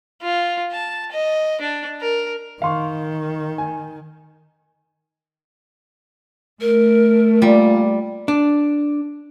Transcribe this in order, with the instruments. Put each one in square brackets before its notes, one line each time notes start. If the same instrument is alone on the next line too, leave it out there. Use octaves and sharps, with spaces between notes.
[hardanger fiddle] F4
A5
D#5
D4
A#4
[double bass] D#3 [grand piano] F5 C6 C#6
[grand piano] G#5
[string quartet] A3 [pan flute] A#4
[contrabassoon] A#2 [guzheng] G3
[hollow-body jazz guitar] D4